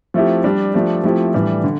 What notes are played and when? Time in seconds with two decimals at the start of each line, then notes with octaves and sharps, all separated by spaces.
0.14 F3 A3 C4 E4 G4
0.44 G3 D4 G4
0.74 F3 A3 D4 G4
1.04 F3 A3 C4 E4 G4
1.34 A2 E3 G3 D4
1.64 D3